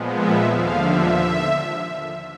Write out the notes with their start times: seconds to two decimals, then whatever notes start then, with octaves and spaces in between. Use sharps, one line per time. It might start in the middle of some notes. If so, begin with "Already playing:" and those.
Already playing: A#2 F3 G#3 B3
0.12 E5
0.47 D#2 D3 F3 F5
0.83 E5